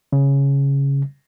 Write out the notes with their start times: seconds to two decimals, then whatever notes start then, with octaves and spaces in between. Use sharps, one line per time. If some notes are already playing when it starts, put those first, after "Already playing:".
0.13 C#3